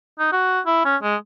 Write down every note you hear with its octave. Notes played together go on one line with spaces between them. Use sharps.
D#4
F#4
E4
C#4
G#3